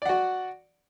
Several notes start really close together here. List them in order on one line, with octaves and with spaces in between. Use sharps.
D5 F#5 F#4